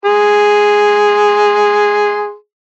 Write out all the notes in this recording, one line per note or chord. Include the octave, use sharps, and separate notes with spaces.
G#4 C6